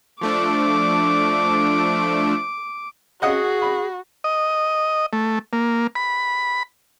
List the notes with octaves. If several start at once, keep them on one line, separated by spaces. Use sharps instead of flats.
F3 A3 D4 D6
F#4 G#4 D#5 F#5 D#6
B5
D#5
A3
A#3
B5